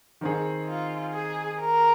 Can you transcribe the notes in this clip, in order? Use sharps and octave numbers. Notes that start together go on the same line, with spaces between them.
D#3 C4 D#4 G#4
F4
G#4
A#4